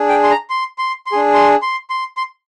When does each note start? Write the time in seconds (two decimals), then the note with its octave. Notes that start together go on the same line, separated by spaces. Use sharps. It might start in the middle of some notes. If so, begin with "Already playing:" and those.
Already playing: D4 G#4
0.09 G5
0.23 C6
0.30 A#5
0.50 C6
0.78 C6
1.07 C6
1.12 D4 G#4
1.34 C6
1.62 C6
1.90 C6
2.17 C6